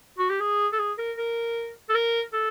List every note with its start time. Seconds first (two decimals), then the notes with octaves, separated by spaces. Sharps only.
0.19 F#4
0.30 G4
0.41 G#4
0.73 A4
0.79 G#4
0.98 A#4
1.18 A#4
1.89 A4
1.94 A#4
2.33 A4